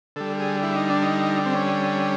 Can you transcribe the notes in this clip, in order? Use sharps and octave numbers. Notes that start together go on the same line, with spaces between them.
D3 G3 A4
G#4
E4
D#4
D4
D#4
C4
C#4